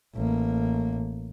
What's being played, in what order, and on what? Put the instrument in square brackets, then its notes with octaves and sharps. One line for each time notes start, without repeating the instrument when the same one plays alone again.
[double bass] A1 A#3